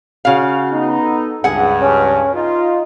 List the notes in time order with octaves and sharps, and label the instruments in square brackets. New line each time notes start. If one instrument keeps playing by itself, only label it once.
[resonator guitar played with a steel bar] C#3 F5 [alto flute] F#4
[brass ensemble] B3 D#4
[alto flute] A4
[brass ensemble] C#2 G2 [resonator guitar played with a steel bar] G#4 F#5
[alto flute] C#4
[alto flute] D#4 [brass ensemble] F4